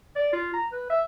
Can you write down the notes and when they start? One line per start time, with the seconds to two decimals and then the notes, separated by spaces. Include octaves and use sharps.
0.16 D5
0.33 F4
0.54 A#5
0.72 B4
0.90 E5